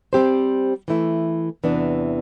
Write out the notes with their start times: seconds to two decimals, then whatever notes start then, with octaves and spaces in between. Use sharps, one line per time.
0.13 G3 C4 G4 C5
0.88 E3 A3 E4
1.64 E2 C3 E3 B3 D4